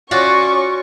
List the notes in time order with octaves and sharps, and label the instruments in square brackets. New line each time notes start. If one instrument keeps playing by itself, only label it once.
[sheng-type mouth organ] C#4 D5 [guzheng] F4 F#4 [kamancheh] C#6